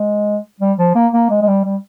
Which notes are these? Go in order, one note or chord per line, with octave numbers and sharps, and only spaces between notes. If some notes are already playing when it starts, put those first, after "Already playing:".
Already playing: G#3
G3
F3
A#3
A#3
G#3
G#3
G3
G3